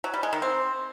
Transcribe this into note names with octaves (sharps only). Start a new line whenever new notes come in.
F#3
G3
G#3
D#3
C4